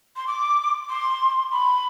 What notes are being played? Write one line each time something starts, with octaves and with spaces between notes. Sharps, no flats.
C6
D6
C6
B5